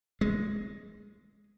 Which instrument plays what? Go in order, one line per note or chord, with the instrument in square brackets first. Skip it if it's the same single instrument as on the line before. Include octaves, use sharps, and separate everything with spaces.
[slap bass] G#3